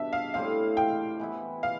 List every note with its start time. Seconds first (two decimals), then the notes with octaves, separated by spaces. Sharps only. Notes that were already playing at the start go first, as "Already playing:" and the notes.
Already playing: B2 G3 D4 E5
0.13 F5
0.34 A2 G3 C4 F5
0.77 G5
1.20 E3 B3 E4
1.63 F5